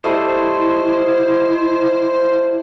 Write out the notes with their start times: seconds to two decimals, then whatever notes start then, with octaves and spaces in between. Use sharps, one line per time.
0.04 G3 A3 E4 C5 D#5